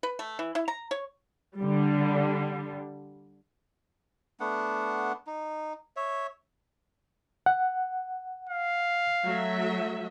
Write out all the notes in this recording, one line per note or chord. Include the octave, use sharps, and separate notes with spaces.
B4
A3
E3
E4
A#5
C#5
D3 G3
A3 B3 D4 F#5
D#4
C#5 E5
F#5
F5
F#3 A3 E5